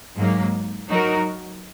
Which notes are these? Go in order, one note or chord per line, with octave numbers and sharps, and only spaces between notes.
G#2 F#3 A#3
F#3 D#4 F#4 A#4